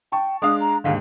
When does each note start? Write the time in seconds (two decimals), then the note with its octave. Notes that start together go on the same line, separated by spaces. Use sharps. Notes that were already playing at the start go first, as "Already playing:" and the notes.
0.12 G5 A5 C#6
0.42 G#3 D4 F5 D#6
0.60 A#5
0.84 D#2 G#2 D3 F5